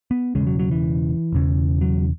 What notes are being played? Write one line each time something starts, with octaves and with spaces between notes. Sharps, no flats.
B3
E1 E2 C#3 G#3
F#3
F#3
E3
E1 E2 C#3
F#3